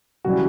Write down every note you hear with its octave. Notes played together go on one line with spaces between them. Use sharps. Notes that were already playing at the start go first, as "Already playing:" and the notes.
C#3 E3 G3 F#4